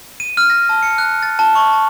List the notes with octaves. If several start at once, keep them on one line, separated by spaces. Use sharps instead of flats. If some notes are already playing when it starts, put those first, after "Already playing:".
D#7
F6
A#6
A5
C#7
F#6
A6
A5
C#6
A5